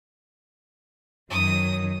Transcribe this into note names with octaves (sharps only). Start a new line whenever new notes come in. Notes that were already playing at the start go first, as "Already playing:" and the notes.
F#2 D#3 F#3 D#6